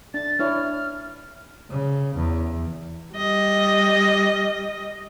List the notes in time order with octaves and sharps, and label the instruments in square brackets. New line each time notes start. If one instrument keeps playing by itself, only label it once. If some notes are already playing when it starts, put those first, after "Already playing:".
[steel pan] D4 [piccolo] A6
[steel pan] D4 E4 C#5 [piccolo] F6
[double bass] C#3
E2
[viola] G3 D#5